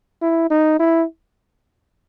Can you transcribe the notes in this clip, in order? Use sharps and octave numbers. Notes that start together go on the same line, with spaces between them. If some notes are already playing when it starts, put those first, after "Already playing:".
E4
D#4
E4